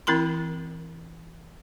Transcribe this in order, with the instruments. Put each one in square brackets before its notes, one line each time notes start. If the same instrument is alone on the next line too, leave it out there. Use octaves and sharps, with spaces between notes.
[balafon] E3 C4 E4 A#4 B5 C6